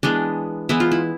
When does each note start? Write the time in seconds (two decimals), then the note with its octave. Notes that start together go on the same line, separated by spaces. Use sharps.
0.03 E3 G#3 B3 D4
0.69 E3 G#3 B3 E4
0.80 F4
0.92 E4